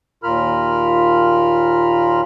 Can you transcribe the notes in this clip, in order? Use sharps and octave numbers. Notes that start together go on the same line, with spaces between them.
D#2 A#2 F4 A#4 B5 F6